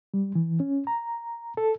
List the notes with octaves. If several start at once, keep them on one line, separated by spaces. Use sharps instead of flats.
G3
E3
C#4
A#5
A4